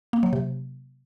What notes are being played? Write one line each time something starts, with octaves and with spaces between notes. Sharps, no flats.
A#3
F#3
C3